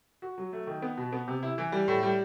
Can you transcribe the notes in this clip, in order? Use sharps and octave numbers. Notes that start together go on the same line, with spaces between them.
F#4
F#3
A3
D#3
B3
B2
B3
C3
E4
E3
G3
A2
G3